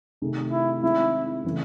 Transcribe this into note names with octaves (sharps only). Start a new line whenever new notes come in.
C3 D#3 A3 D#4 G#4
E4
D#3 G#3 C4 E4
C#3 E3 A3